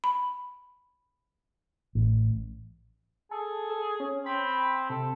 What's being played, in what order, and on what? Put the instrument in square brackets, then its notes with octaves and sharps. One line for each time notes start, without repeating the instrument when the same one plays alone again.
[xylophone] B5
[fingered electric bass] A1
[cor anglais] G#4 [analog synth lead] A4
[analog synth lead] A4
C#4
[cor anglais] C4 [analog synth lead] B5
[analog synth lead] C3 [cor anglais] A4